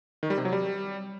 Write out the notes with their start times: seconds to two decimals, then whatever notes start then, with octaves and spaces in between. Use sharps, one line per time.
0.23 D#3
0.30 G3
0.38 C3
0.45 F#3
0.53 G3